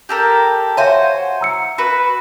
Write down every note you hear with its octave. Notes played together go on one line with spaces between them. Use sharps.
G4 A4 A#4
F#4 C5 C#5 E5 F5 G#5
A#5 E6 C#7
F#4 B4